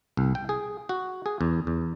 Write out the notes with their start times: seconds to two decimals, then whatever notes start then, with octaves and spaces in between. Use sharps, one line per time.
0.17 C2
0.35 G5
0.49 G#4
0.89 F#4
1.26 G#4
1.41 E2
1.67 E2